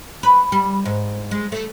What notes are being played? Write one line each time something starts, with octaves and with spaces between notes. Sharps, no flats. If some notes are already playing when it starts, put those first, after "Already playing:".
B4
G3
G#2
G#3
A3